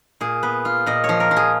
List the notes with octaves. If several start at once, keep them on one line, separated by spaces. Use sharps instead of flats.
A#2 G#4
B3 B4
F4
A#2 D#5
C#5
F3
A#4
F3
G#4